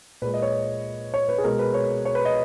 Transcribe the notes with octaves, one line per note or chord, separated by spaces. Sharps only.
A#2 G#3 B4
D#5
C#5
C#5
B4
G#4
B2 G#3 A#4
B4
C#5
C#5
B4
D#5